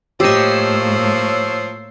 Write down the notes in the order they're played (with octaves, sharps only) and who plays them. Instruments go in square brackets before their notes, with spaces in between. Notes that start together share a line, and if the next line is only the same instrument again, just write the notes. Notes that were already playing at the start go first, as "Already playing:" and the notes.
[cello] A2 A#3 [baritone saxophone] F3 [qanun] G4 D#5 [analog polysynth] C#5 E6 C7